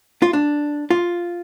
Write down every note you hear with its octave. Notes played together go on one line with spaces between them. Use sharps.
F4
D4
F4